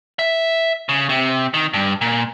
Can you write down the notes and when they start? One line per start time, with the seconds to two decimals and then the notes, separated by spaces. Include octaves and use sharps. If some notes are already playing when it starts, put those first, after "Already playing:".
0.19 E5
0.89 C#3
1.09 C3
1.54 D#3
1.74 G2
2.01 A#2